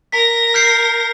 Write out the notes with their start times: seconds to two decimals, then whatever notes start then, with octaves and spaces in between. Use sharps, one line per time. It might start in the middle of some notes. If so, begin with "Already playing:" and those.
0.12 A#4 A#6 B6
0.54 F6 G6 C7